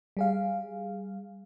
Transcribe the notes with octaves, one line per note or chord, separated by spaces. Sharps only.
G3 G#4 F5